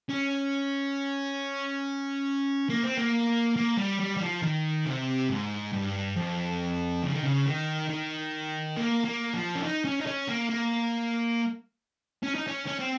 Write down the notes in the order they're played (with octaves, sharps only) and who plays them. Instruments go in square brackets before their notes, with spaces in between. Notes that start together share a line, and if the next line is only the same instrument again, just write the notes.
[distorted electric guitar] C#4
A#3
C4
A#3
A#3
G3
G3
G3
F3
D#3
C3
G#2
G2
F2
C#3
D#3
C#3
D#3
D#3
A#3
A#3
F3
C#4
D#4
C#4
D#4
C#4
A#3
A#3
C#4
D#4
C#4
C#4
C4